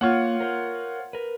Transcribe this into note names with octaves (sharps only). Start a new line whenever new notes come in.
A#3 F4 C#5 F#5
A#4 C5
A#4 B4